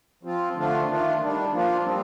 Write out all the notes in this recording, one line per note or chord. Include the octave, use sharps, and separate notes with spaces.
F3 C4 F4
D3 F3 A3 D4 F4
D#3 A3 D4 F4
D#3 G3 D4
F3 A#3 D4 F4
A#2 G3 C4